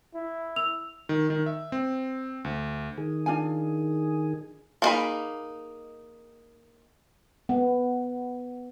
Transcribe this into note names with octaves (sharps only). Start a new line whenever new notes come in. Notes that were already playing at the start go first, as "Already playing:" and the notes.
E4
E6 F7
D#3
D#3
E5
C4
D2
D#3 G#4
D4 F4 G#5
F3 A#3 D#4 G#4 B5
B3